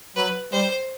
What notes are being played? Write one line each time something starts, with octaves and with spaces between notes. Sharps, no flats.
F#3 B4
G3 C5